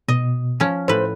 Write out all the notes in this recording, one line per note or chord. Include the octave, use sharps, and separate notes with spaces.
B2 D#5
F3 C#4
A2 B4 C5